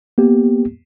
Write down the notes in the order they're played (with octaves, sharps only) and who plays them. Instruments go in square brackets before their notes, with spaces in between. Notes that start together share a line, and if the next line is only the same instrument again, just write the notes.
[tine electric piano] A#3 B3 G4